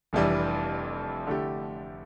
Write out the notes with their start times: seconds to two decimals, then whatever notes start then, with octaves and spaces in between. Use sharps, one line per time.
0.13 F1 F2 E3 G3 D4
1.27 D3 A3 E4 G4